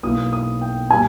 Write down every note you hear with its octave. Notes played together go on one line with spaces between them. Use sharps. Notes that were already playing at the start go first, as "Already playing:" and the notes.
B1 B2 A#3 E4 D#6
D#6
G5
A#2 G3 G#5